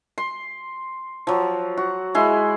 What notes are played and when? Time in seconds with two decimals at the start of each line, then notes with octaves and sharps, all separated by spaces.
0.18 C6
1.27 F3 F#3
1.77 F#4
2.15 G#3 E4 C6